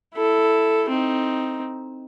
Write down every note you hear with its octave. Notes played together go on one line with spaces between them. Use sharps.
E4 A4
C4 D#4